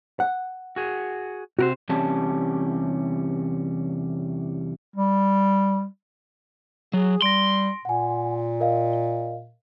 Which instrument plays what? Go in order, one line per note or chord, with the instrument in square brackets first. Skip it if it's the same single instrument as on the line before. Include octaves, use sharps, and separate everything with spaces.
[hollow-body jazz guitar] F#5
[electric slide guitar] F#4 G#4
[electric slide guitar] C3 A#4 C5 [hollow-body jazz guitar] F#4
[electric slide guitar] E2 C3 G3 C#4 A5
[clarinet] G3
[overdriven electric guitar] F#3 [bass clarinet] G#4
[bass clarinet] G3 [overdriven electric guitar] C6 [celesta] A#6 D7
[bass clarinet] A#2 [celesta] F#5 G#5
[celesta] A#4 D#5 F5